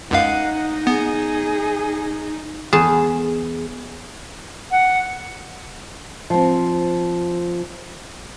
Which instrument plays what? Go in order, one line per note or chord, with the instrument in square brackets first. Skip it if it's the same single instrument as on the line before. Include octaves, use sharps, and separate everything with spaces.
[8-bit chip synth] C#2 F#2 F5 [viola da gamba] D#4 [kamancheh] D#5 F#5
[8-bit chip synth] B3 [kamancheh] G#4
[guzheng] E2 G#4 A5
[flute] F#5
[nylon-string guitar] F3 C4